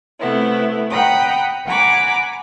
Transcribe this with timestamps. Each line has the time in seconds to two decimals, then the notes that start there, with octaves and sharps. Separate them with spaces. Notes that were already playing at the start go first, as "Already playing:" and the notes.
0.19 C3 A3 B3 E4
0.90 F#5 G5 A#5 B5 D#6
1.65 F#5 G#5 A#5 B5 D6